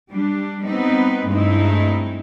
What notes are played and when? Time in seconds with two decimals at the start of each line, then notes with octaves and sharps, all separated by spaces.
0.11 G3 D4
0.65 G3 B3 C4 D#4 B4
1.26 G2 G#3 A3 C4 D#4 E4